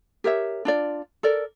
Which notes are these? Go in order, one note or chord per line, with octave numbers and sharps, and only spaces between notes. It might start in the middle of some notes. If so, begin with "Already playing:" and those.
G4 A#4 C#5 E5
D4 F4 D5
A4 A#4 D5